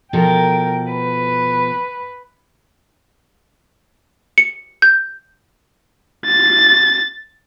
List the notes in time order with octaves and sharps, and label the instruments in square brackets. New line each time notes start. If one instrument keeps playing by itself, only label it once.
[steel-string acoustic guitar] B2 F3 A4 [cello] A#4 G5
[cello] B4
[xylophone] C#7
G6
[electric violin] A6